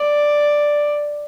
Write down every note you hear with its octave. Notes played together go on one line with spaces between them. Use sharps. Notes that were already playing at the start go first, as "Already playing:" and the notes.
Already playing: D5